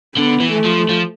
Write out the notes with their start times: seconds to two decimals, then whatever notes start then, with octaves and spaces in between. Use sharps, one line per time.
0.17 D3 B3
0.40 E3
0.52 A3
0.65 F3
0.89 F3